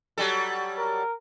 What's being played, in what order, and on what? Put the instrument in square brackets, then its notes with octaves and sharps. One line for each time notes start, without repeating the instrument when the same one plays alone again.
[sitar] F#3 G3 A4
[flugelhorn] A#4